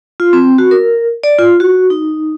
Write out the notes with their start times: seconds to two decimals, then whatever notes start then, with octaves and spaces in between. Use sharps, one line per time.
0.20 F4
0.33 C4
0.58 F#4
0.71 A#4
1.24 D5
1.39 F4
1.60 F#4
1.90 D#4